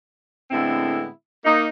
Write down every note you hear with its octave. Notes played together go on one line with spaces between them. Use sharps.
A2 D3 G#3 B3 C4 E4
A#3 D#4